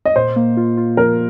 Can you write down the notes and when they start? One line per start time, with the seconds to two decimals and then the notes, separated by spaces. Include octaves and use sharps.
0.05 D#5
0.16 A#2 C5
0.36 A#3
0.57 F4
0.77 F4
0.97 F3 A#4